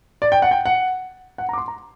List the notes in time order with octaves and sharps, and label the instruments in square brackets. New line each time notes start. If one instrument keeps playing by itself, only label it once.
[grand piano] D5
G5
F#5
G5
F#5
F#5
A#5
D6
C6
A#5